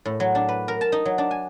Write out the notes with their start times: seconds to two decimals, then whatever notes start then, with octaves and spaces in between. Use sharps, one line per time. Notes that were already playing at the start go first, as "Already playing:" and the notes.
0.06 A2
0.20 F#3
0.35 D4
0.49 B4
0.68 A#4
0.81 A5
0.92 D#4
1.05 F#3
1.18 D4
1.31 G#5